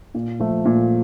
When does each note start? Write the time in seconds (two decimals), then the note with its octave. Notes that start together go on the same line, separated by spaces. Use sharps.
0.14 A#2
0.40 F3 A3
0.65 A#2